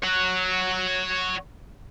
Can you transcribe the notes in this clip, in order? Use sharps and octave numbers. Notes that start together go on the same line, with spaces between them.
C#5 F#5